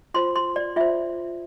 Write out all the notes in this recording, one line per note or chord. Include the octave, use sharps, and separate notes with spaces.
F4 C5 C6
C6
D5
F4 C5 E5